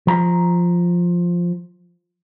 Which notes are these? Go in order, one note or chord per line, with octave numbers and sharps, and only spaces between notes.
F3 A#5